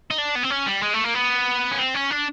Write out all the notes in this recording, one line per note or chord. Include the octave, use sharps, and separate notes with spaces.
D#4
D4
B3
C4
C#4
G3
G#3
A3
A#3
B3
C#4
C4
C#4
D4